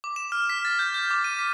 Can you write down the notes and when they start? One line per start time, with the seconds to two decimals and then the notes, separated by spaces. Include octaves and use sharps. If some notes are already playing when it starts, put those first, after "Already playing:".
0.04 D6
0.16 E7
0.32 F6
0.50 B6
0.65 A6
0.79 G6
0.94 G6
1.11 D6
1.24 D#7
1.39 B6